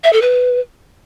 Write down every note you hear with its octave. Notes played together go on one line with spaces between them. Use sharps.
E5
A4
B4